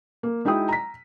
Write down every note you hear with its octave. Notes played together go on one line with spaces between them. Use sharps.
A#3
G#3 D#4 E4 F#4 G5 D#6
A#5 B6